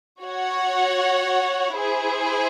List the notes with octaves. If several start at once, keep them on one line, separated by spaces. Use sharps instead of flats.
F#4 C#5 F#5
E4 G#4 C5